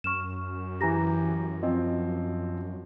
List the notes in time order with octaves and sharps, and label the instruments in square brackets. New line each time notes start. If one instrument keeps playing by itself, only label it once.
[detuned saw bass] F#2 [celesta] C#6 F6 E7
[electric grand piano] E3 G4 [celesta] G#5 A#5 A#6
[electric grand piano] F3 C4 [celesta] D#5